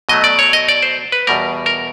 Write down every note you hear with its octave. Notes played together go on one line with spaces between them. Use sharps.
B2 F#3 A3 D#5
D5
C#5
D#5
D5
C5
B4
E2 B2 G3 A#4
A#4